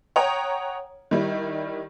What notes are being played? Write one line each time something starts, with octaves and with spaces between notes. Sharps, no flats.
C#5 F#5 G5 A#5 D#6
D#3 G3 E4